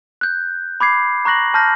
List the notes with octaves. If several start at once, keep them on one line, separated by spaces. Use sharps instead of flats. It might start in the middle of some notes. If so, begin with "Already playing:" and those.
F#6 G6
B5 D6 G#6 C7
A#5 C#6 F#6 A#6 F#7
A5 F6 G6 A#6